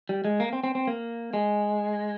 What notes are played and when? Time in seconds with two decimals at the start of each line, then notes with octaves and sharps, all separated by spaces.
0.09 G3
0.25 G#3
0.40 A#3
0.53 C4
0.64 C4
0.75 C4
0.87 A#3
1.33 G#3